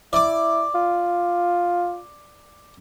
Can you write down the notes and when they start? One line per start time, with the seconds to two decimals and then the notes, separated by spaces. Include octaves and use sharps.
0.13 E4 D5 D6
0.75 F4